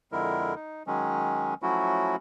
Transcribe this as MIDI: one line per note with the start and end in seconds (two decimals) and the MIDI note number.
0.12 0.55 41
0.12 0.55 50
0.12 0.55 56
0.12 0.55 64
0.12 0.55 70
0.56 0.83 63
0.87 1.54 51
0.87 1.54 54
0.87 1.54 56
0.87 1.54 61
1.62 2.16 53
1.62 2.16 54
1.62 2.16 57
1.62 2.16 61
1.62 2.16 64
1.62 2.16 66